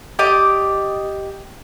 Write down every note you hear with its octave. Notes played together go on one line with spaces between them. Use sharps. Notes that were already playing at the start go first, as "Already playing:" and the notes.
G4 D5 D#5 D6